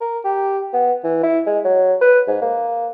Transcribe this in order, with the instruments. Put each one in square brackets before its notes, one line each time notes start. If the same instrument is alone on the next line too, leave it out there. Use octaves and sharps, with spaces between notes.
[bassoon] A#4
G4
B3
E3
E4
G#3
F#3
B4
G#2
A#3